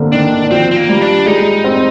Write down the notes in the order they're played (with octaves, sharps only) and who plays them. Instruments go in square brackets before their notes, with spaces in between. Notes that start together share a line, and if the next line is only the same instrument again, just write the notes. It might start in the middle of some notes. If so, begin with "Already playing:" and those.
Already playing: [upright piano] D3 A#3 C4
[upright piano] D#3 [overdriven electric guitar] D4
[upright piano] D#3
D#3
[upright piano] F3 [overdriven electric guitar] C4
[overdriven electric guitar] C4
A#3
[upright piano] G3
[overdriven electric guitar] D4
[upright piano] G#3 [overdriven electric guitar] D#4
[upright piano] C4